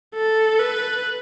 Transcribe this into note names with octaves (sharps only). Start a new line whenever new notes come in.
A4
B4